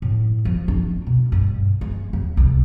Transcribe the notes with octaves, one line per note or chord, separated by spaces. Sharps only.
A2
F3
D4
B2
G2
G#3
D#2
C2